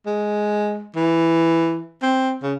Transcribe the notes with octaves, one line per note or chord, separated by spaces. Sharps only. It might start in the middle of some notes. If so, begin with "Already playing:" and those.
G#3
E3
C4
C#3